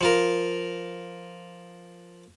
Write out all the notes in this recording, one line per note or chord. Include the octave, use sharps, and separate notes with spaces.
F3 F4 A#4